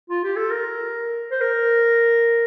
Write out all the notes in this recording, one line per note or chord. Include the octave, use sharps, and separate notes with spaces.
F4
G4
A4
A#4
C5
A#4